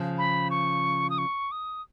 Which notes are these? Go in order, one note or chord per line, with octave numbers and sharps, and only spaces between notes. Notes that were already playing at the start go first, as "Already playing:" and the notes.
Already playing: C#3 F3
B5
C#6
D#6
C#6
D#6